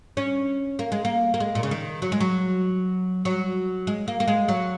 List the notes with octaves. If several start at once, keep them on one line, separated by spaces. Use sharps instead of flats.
C#4
A#3
G#3
A#3
A#3
G#3
A#2
C#3
D#3
F#3
G#3
F#3
F#3
G#3
A#3
A#3
G#3
F#3